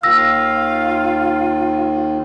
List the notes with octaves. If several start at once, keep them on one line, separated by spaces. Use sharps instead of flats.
D#2 D#3 F4 F5 E6 A#6